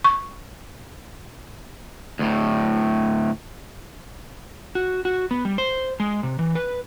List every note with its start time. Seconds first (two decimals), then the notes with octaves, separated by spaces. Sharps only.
0.04 C#6
2.19 D2 A2
4.75 F#4
5.05 F#4
5.31 B3
5.45 G3
5.58 C5
6.00 G#3
6.23 C3
6.39 E3
6.55 B4